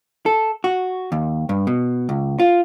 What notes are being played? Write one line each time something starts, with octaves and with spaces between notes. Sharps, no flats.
A4
F#4
D#2
G2
B2
C#2
F4